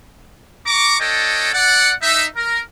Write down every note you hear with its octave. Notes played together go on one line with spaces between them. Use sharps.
A#5 C#6 D6
D4 A4 C#5 D#5 G5
D5 F#5
D#4 E5
A#4